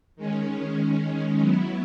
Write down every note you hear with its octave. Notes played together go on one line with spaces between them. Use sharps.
D#3 G#3 C#4
F#3 B3 E4